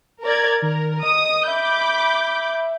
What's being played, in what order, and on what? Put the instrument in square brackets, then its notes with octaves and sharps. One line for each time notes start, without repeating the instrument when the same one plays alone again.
[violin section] A#4 D5 G#6
[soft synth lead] D#3 [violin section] A#4
[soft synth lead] D#5 [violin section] D#6
[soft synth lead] E5 [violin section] B5 D6 G6